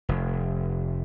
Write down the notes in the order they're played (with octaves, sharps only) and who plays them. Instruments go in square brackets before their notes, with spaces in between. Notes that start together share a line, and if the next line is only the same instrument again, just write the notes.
[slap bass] F1